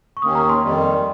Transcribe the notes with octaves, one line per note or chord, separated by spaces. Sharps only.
C#6
D#2 D#3 A#3 C#4 D#6
A#5
C6
F2 D#3 G3